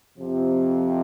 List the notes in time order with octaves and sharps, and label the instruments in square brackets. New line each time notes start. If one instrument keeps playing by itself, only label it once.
[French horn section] F2 C3 F3